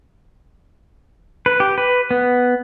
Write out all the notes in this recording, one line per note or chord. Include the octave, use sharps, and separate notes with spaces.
B4
G4
B4
B3